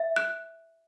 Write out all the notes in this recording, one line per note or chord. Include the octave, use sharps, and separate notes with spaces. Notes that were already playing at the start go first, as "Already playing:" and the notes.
Already playing: E5
F#6